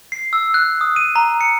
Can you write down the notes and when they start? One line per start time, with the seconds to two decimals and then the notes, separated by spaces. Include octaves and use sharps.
0.12 C7
0.33 E6
0.54 F#6
0.81 D#6
0.96 D#7
1.16 A#5
1.41 C#7